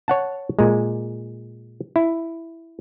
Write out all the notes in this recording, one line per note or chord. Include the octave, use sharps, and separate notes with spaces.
C#5 F#5 A5
A#2 G#3
E4